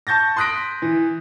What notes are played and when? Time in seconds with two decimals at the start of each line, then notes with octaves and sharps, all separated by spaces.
0.07 A5 C#6 G6 A6 A#6
0.36 C6 D#6 F#6 A#6 B6 D7
0.82 E3